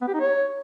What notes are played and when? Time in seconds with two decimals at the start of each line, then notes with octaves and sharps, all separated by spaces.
0.02 B3
0.08 G4
0.14 D#4
0.20 C#5